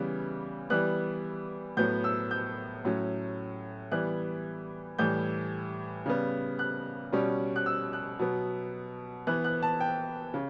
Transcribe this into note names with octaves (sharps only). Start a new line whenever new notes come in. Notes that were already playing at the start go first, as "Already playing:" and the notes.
Already playing: C#3 E3 G3 B3
E3 G3 B3 F#6
A2 F#3 B3 G6
E6
G6
A2 F#3 C#4
E3 G3 B3 F#6
A2 E3 G3 G6
C#3 G3 B3
F#6
B2 G3 C#4
F#6
E6
F#6
B2 F#3 B3
E3 B3 F#6
F#6
A5
G5
C#3